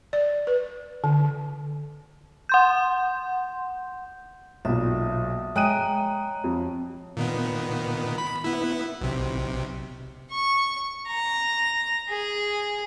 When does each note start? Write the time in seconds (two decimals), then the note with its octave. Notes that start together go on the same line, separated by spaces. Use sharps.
0.13 D5
0.47 B4
1.04 D3
2.49 F#5 C6 G6
4.65 B1 A#2 E5 D#6
5.56 G#3 C#5 G5 G#5 A#5 D#6 F#6 D#7
6.44 F2
7.17 A#2 D#3 B3
8.18 B5
8.44 B3 E4
9.01 B1 C3
10.31 C#6
11.08 A#5
12.09 G#4